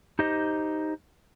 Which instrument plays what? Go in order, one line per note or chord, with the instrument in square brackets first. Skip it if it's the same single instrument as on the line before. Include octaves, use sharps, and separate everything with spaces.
[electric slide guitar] D#4 G4 C5 D#5